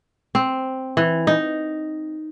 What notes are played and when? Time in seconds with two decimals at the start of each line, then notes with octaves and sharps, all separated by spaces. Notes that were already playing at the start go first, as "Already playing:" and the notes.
0.35 C4
0.97 E3
1.27 D#4